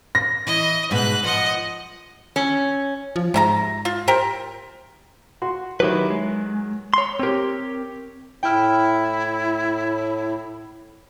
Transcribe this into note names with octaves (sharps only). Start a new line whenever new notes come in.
A#6
E3 E4 D#5
G#2 B2 B3 B4 F#6
F3 D#5 F#5
C#4
F3
G#2 C3 E4 A#5
F4
G4 A#4 C5
F#4 C6
D#3 F#3 E4 G4 B4
G#3
C#5 C6
C4 G4 A#4 C#5
A2 E4 G5 F6